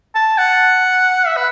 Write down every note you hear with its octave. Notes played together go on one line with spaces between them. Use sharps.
A5
F#5
E5
B4